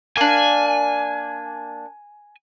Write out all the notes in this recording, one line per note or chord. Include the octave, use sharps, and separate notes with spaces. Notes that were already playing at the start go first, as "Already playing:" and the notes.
A#3 D4 G#5